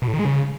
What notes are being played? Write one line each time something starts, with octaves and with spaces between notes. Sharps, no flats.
B2
A2
D#3
G#3
C#3